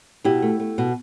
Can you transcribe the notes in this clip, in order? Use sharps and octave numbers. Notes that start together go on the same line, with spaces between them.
B2 E4 G4
A3
A3
B2